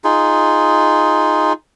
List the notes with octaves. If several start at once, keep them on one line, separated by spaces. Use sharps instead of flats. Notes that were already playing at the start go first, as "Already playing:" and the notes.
D#4 F4 G#4